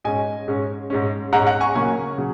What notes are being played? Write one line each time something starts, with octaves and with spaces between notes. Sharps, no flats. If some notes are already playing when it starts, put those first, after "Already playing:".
G#2 G#3 C#4 D#5 G#5
G#2 G#3 C#4
G#2 G#3 C#4
G#2 G#3 C#4 F#5 A#5
F#5 A#5
G#5 C#6
C#3 F#3 A#3 C#4 G#5 C#6
C#3 F#3